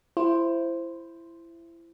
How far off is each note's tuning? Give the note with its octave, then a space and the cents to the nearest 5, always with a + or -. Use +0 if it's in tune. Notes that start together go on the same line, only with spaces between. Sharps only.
E4 +25 C5 +0